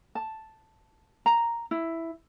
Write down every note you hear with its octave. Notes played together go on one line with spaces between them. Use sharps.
A5
A#5
E4